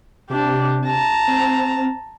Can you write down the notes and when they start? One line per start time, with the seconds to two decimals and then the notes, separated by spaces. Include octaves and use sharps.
0.30 C3 D4 G4
0.86 A5 A#5
1.28 C4